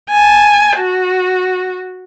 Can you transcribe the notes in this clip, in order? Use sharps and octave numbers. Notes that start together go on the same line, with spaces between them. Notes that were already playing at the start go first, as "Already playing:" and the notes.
G#5 A5
F#4